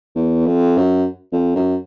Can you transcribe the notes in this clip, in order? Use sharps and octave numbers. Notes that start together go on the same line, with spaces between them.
E2
F2
F#2
F2
F#2